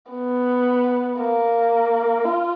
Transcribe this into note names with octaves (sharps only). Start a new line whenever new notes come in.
B3
A#3
F4